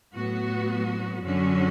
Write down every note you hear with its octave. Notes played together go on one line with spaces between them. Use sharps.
A2 F#3 B3 F#4
F#2 D3 F#3 C#4 F#4